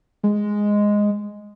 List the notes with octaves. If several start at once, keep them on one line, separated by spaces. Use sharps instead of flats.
G#3